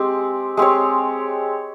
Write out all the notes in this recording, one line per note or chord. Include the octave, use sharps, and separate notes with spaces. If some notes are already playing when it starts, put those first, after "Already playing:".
Already playing: G#3 C4 G4
G#3 C4 G4 C#5